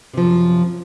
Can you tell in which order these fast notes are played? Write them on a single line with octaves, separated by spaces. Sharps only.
C3 F3 F#2